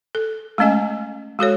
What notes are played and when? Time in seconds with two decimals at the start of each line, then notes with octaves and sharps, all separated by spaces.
0.15 A4
0.58 G#3 A3 C#4 D#5 G#5
1.39 G#3 F#4 A4 C#5